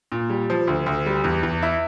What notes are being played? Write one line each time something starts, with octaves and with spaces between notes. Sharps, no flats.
A#2
G3
F3
D2
D2
G3
E2
E2
E4